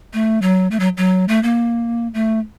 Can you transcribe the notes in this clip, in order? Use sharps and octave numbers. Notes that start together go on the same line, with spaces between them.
A3
F#3
A3
F#3
F#3
A3
A#3
A3